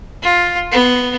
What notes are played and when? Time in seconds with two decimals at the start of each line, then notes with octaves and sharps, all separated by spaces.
0.23 F4
0.72 B3